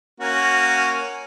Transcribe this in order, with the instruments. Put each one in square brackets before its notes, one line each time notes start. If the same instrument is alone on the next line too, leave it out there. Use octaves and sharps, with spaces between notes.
[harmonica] A#3 C#4 F#4